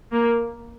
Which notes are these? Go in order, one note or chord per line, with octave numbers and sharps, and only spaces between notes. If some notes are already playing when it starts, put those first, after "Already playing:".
A#3